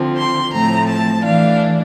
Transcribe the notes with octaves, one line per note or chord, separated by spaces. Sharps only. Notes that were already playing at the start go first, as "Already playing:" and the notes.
Already playing: D3 F3 C4
C6
A2 F3 A3 C4 A#5
A5
E3 A3 D4 F5